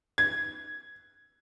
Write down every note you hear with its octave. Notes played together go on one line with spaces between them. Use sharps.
G#6